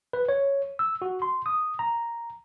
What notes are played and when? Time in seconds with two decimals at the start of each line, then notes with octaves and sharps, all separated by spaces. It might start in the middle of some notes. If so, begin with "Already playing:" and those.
0.13 B4
0.29 C#5
0.79 E6
1.02 F#4
1.22 C6
1.46 D#6
1.79 A#5